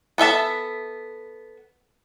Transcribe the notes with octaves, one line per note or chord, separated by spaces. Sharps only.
B3 A4 E5 A5